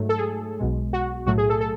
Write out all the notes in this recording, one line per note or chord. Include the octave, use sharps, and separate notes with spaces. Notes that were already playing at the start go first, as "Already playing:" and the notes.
Already playing: G#2 F#3 A3
A4
G#4
B1 B2 G#3
F#4
B1 A2 F#3 A3 F#4
G#4
A4
A4